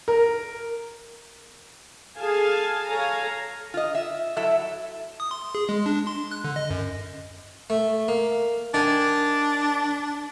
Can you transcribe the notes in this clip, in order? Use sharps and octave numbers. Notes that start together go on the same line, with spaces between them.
A#4
G#4 A4 F5 G#5 A5
A4 C#5 F5 G#5 A#5
F4 D#5
E5
F#3 E4 A4 E5
D#6
C6
G#4
G#3
D4
C6
F#6
D3
D#5
F#2
A3
A#3
D#3 D4 G#5